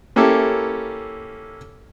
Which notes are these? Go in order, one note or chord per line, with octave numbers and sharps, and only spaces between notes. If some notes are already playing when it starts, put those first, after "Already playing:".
A#3 C#4 E4 G4 A4